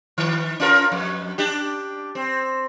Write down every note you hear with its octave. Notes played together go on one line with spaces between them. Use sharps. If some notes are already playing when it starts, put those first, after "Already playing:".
D#3
C#4 F4 A#4
F2
D4 G4
C4